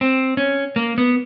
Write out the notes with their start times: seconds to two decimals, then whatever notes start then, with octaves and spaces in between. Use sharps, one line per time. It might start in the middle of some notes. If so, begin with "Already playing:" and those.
0.01 C4
0.37 C#4
0.76 A#3
0.98 B3